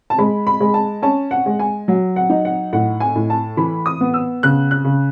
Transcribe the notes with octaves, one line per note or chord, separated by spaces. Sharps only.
A5
G#3 B5
B5
G#3
A5
C#4 A5
F#5
G#3
G#5
F#3
F#5
D#4
F#5
A2 F#5
G#5
A2
A5
E3 B5
D#6
B3
E6
C#3 F#6
F#6
C#3